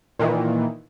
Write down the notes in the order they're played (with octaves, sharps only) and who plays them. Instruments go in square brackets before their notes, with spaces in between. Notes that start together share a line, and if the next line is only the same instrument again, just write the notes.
[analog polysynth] A#2 D#3 E3